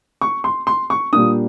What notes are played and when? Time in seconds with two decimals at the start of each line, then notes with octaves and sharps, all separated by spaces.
0.21 C#6
0.44 C6
0.67 C6
0.90 C#6
1.12 A#2 G3 A#3 D4 D#6